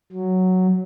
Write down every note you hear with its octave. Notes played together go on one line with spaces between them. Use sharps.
F#3